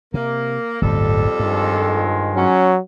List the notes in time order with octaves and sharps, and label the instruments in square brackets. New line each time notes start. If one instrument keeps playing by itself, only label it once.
[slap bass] C3 [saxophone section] A#3
[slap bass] D1 G1 [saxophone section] F2 G3 A4
[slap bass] G2 [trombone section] D#3 F3 G#3
[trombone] F#3 [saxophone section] C#4